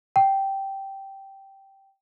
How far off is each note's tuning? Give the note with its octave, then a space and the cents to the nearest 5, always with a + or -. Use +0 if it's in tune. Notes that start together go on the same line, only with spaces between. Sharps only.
G5 -10